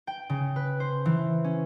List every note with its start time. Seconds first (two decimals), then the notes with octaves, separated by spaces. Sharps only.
0.07 G5
0.30 C#3
0.56 B4
0.80 C5
1.06 E3
1.44 C#4